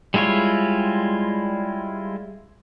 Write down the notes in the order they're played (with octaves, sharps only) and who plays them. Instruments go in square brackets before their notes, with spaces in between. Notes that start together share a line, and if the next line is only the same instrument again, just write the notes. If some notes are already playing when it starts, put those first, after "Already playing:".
[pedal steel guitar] G3 G#3 E4 F4 C#5